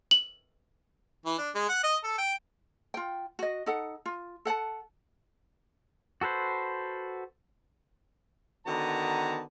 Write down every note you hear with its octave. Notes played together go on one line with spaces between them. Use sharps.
F#7
E3
D4
G#3
F#5
D#5
A4
G5
F4 G5
F#4 D#5
D#4 A4 F#5
F4
A4 F#5 G5 A5
F#4 A4 B4 C5
D3 D#3 B3 F#4 A5 A#5